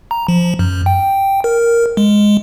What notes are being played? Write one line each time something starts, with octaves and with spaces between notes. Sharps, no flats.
A#5
F3
F#2
G5
A#4
G#3